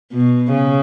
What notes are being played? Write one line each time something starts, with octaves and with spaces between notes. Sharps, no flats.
B2
C#3